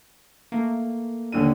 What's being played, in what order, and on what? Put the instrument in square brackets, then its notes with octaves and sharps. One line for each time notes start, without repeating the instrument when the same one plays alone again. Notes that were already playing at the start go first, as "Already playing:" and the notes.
[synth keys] A3 A#3
[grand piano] D#2 D3 D#7